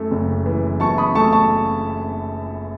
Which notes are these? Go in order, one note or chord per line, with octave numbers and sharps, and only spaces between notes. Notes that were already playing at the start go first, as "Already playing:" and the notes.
Already playing: F#2 A3
F#1
E3
F#2 A5 C#6
B5 D#6
A3 A5 C#6
A5 C#6